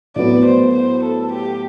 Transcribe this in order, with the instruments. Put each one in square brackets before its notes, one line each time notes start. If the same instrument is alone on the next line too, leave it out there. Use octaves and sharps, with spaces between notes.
[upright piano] A2 F#3 B3 [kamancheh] D5
[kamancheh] C5
C5
A4
G4